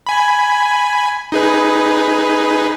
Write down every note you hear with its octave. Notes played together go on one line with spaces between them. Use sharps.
G#5 B5
D#4 G#4 B4